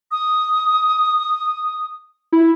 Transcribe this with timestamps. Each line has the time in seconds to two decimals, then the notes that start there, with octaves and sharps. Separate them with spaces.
0.11 D#6
2.32 E4